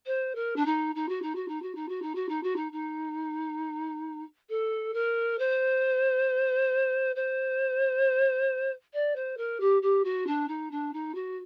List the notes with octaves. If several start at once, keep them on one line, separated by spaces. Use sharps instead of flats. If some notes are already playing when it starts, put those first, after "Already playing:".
C5
A#4
D4
D#4
D#4
F#4
D#4
F#4
D#4
F#4
D#4
F#4
D#4
F#4
D#4
F#4
D#4
D#4
A4
A#4
C5
C5
D5
C5
A#4
G4
G4
F#4
D4
D#4
D4
D#4
F#4